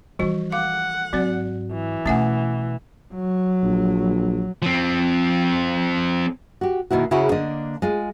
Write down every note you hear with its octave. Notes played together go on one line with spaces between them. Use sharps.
E3 F3 G3 D#4 F#4
F5 F#5 D6
G#2 F#3 C4 F#4 D5
E3
B2 A3 B3 C#4 E5 F#5 G#5
F#3
A#1
F3 C4
F#4 G4
B2 D#3 A#3 E4 F#4
C#3 C#4 E4 F#4 G#4 A#4
D3 A#3 D4 D#5
G#3 F4